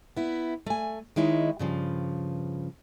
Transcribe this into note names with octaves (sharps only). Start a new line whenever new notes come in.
B3 E4
A3 G#5
D#3 G#3 D#4 E4 C#5
G2 C#3 F3